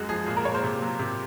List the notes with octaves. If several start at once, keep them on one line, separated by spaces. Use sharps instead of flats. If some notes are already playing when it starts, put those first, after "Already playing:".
Already playing: F#2 G#3 F#4
F3 G#4
A#2 G#4
A#4
A#2 C#5
C5
C3
F#3
C3